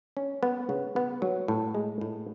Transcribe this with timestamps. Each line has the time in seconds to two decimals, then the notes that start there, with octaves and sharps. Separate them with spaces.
0.17 C#4
0.43 B3
0.69 C#3
0.96 B3
1.22 F#3
1.48 A2
1.75 G#3
2.01 A2